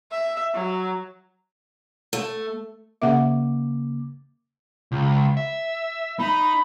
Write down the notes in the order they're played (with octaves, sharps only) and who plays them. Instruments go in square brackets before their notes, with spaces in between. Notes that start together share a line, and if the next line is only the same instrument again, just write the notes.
[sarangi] E5
F#3
[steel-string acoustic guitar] A3
[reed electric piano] C#3 A#3 D6 [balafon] E5 F#5
[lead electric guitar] C#2
E5
[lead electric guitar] D#4 [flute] B5